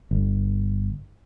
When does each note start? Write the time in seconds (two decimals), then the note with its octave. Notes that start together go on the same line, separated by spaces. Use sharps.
0.11 G1